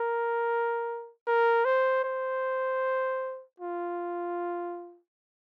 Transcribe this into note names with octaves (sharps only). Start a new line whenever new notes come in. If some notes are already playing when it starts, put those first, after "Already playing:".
Already playing: A#4
A#4
C5
C5
F4